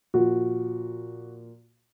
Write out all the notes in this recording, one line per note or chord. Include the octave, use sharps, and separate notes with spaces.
A#2 F3 F#4